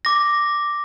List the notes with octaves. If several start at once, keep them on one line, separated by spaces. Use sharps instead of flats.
D6 A#6